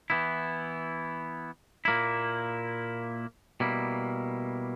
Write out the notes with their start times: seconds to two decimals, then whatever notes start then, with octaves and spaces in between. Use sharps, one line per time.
0.10 E3 B3 E4
1.85 A#2 A#3 E4
3.60 B2 G3 A#3 E4